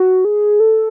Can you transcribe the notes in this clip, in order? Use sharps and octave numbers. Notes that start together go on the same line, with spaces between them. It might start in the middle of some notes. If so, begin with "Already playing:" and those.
Already playing: F#4
G#4
A4